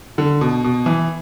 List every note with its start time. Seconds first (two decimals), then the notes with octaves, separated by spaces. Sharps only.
0.18 D3
0.41 B2
0.64 B2
0.86 E3